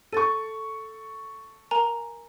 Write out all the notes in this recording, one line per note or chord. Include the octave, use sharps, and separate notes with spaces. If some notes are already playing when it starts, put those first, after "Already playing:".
A4 C#6 A6 D#7
A#4 G#5 A#5